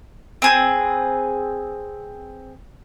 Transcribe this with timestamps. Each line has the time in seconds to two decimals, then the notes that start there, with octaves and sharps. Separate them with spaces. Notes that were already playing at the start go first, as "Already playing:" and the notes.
0.42 C4 G#4 B4